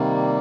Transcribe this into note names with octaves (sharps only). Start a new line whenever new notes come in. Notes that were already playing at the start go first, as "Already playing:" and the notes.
Already playing: C3 D#3 G3 A#3